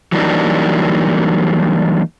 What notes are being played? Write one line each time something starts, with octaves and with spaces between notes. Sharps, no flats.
E3 F#3 G3 A#3 D4 D#4